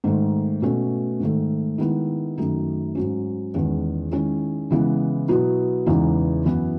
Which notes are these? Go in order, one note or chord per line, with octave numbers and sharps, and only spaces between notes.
G#2 D#3 A3
B2 A3 C#4
G#2 D#3 A3
D#3 G#3 B3 E4
F#2 D#3 A3 D#4
G#2 F#3 C#4
E2 D#3 G#3 C#4
D#3 G#3 C#4 E4
C#3 E3 G#3 B3 E4
B2 F#3 B3 E4
E2 C#3 E3 G#3 D#4
F#2 E3 B3 E4